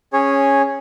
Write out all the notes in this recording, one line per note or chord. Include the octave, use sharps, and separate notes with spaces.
C#4 G#4 C#5